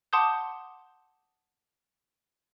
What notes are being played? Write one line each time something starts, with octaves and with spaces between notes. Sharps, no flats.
F#5 A5 C6 D6 D#6 G6